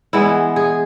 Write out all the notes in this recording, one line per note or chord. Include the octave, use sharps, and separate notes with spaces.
E3 G#3 B3 E4
G#4